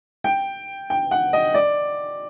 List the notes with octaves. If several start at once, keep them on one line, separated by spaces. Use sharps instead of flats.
G5
G5
F#5
D#5
D5